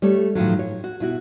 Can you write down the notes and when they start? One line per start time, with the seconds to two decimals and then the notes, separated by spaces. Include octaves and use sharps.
0.02 G3 A3 C#5
0.35 A2 D#3 F3 F#3
0.59 C#5
0.84 F#4
1.00 B2 E4 F#4